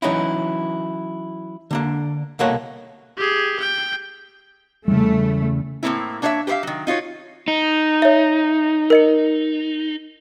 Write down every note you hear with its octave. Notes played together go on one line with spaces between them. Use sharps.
E3 F#3 C#4 D#4 E4
D3 A#3 D4
C2 B2 A#3 A4 C#5 F#5
G4 G#4
G5
E2 C#3 G3 A3
A2 F#3 A#3 C4 E4
A#3 D4 C#5 D#5 E5
G4 B4 C5 E5 F5
D#3 F#3
D#4 F4 F#4 C#5
D#4
C#5 E5
A#4 D#5 C#7